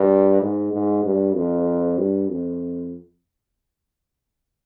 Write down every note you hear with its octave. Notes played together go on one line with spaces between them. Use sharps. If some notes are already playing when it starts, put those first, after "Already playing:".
Already playing: G2
G#2
G#2
G2
F2
G2
F2